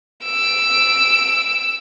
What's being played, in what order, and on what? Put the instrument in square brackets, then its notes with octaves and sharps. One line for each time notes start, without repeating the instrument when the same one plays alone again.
[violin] E6 D7